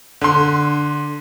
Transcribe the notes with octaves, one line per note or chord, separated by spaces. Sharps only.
D3 C6